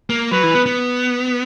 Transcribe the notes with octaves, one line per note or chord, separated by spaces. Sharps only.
A#3
F#3 B4
E3
B3
B3